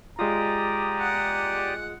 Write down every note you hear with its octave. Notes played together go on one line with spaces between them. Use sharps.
G#3 F4 G4 D5 A#5 D#6
F#5